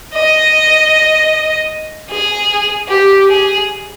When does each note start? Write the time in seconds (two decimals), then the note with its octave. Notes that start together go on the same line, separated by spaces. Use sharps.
0.15 D#5
2.11 G#4
2.89 G4
3.28 G#4